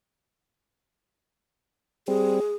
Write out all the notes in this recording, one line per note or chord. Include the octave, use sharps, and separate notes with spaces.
G3 C4 G#4